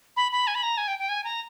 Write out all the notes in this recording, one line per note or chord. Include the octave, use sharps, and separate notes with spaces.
B5
B5
G#5
B5
A#5
G#5
G5
G5
G#5
A#5